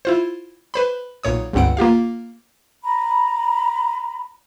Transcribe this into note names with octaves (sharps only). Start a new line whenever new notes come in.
E4 F4 C5
B4 C5 B5
B1 A#2 C#5 D#6
G1 C#2 G2 C4 F#5 D7
A#3 F4 G4 F5
A#5 B5